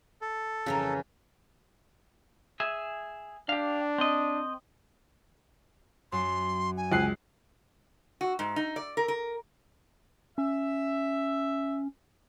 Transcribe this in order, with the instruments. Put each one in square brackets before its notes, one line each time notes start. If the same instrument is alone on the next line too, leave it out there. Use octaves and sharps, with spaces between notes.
[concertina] A4
[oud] F2 E3 A#4 [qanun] C#3
[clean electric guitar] G#4 E5
[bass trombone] D4 [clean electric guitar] G4 F5
[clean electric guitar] C4 D#5
[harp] F#2 [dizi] C6
[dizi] G#5
[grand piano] C#2 F#6 C7
[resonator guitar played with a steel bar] F#4
G#2
D#4
D5
A#4
A#4
[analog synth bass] C#4 [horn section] E5